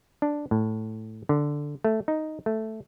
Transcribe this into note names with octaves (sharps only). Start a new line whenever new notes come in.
D4
A2
D3
A3
D#4
A3